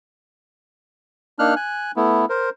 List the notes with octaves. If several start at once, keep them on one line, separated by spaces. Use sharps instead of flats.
A#3 D4 D#4 F6 F#6
G#5 F#6
A3 B3 E4
A#4 C5